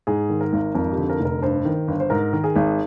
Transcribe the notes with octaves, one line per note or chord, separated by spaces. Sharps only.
G#2 G#4
D#3
A#4
G#1
F2 A#4
G4
D3
A#4
F1
A#4
G2 C5
D#3
G1
C5
G#2 A#4
D#3
G#4
G#1